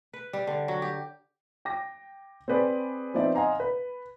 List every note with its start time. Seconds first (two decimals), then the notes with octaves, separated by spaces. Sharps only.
0.13 B4
0.33 G3
0.47 D3
0.68 F#3
0.82 G4
1.65 G5 D6 A#6
2.48 C4 G#4 B4 D5
3.14 F3 B3 C4 D#4 D5 E5
3.35 D#5 F5 F#5 G#5 A#5 C6
3.60 B4